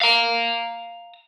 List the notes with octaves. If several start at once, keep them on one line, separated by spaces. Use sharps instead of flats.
F5 A#5